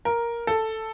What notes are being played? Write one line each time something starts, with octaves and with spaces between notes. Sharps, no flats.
A#4
A4